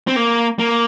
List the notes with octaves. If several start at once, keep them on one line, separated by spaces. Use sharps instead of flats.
C4
A#3
A#3